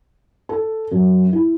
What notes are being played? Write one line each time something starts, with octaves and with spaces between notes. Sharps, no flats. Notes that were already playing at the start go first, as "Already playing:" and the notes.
A4
F#2
E4